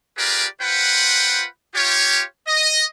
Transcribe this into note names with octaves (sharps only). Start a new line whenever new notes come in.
F4 G4 G#4 A#4 B4 D5
F4 B4 C5 F#5 G5 B5
F4 G4 C#5
D#5